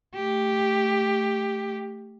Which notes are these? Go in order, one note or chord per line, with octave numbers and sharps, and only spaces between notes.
A3 G4